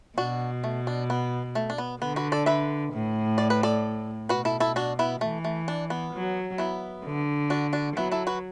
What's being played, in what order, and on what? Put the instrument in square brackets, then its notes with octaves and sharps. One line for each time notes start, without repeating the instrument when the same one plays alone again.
[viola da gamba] B2 [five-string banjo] D4 F#4
[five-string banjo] A3
D4
B3
A3
D4
B3
[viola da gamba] D3 [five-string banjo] B3
[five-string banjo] F#4 B4
A4 D5
B4 E5
[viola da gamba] A2
[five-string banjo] D5
B4
A4 D5
[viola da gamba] B2 [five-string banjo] F#4 B4
[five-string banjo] E4 A4
E4 A4
D4 F#4
B3 E4
[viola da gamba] E3 [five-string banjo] A3
[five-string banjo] A3
D4
B3
[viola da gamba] F#3
[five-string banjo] B3 E4
[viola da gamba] D3
[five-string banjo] D4 F#4
D4 F#4
[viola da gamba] F#3 [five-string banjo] B3 E4
[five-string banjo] E4 A4
F#4 B4